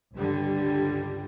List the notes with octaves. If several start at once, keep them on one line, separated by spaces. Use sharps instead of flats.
C#2 G2 D3 G3